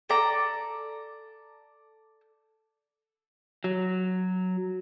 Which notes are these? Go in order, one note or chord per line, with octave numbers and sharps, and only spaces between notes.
A4 D5 A#5
F#3